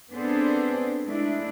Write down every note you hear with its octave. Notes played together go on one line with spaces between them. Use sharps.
B3 C4 D4 G#4 A4 C5
G#3 A3 D4 E4